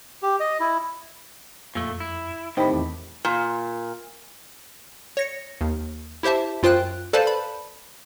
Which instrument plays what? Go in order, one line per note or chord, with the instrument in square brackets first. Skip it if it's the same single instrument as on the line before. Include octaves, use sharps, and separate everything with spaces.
[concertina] G4
D#5
E4
[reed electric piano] F2 [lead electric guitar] A#2 A3
[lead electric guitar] E4
[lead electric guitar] A2 [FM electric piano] D#3 C4 G4 [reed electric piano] D#5 B5
[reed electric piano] E2
[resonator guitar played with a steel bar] A#2
[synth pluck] C#5 A#6 C#7
D#2
E4 G4 C5 E5 A5
F#2 F4 C5 G5 F#6
A4 B4 C5 D5 F5 A5
B5